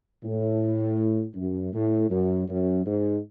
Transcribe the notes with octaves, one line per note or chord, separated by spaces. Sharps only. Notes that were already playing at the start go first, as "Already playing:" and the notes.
A2
F#2
A2
F#2
F#2
G#2